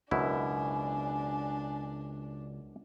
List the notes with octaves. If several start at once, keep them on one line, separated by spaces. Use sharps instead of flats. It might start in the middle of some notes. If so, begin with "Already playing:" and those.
C#2 F#2 B2 D4 E4 G#5